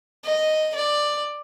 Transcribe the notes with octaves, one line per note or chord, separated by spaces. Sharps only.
D#5
D5